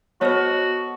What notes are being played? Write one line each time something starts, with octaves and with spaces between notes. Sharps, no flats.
B3 F#4 A4 C5 C#5 D#5